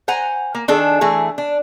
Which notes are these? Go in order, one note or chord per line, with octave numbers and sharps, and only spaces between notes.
C5 F#5 G#5 A#5
A#3
D#3 D4 G#4 A4
E3 A3 G#4
D4